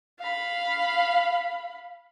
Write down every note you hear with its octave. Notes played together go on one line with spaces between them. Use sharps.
F5 B5